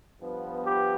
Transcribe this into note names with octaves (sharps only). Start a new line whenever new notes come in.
G2 F3 B3
G4